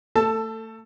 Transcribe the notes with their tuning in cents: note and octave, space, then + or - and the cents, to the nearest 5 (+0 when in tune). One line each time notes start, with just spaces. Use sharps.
A3 +30 A4 +15 A5 +0